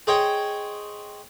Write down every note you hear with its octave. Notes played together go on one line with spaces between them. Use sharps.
G#4 C5 C#5 D#5 G5